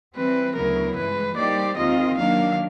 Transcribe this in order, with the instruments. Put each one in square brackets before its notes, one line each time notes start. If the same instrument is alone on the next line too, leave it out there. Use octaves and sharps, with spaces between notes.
[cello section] E3 G3 C4 [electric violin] B4
[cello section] D2 C#3 F#3 B3 E4 [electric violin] A#4
[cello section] G2 E3 G#3 [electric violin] B4
[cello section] G3 A#3 D#4 G4 C5 [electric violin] D5
[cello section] D#2 D#3 G#3 C4 F4 [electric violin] D#5
[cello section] D#3 F#3 A#3 D4 [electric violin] F5